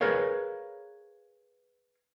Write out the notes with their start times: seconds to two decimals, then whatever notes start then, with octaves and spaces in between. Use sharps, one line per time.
0.01 G#4 A#4 B4 C#5 F5